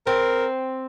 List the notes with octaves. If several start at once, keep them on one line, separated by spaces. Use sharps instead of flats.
C4 A#4